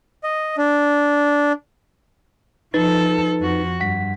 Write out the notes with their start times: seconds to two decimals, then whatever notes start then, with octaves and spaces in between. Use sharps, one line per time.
0.24 D#5
0.58 D4
2.74 F3 D#4 A4 B4 A6
3.40 F2 F#4
3.80 G2 F#5 B6